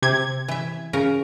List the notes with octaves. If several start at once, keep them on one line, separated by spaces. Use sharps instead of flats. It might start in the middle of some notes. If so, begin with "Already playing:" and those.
C3 G#6
E3 E5
C#3 A#4 A#5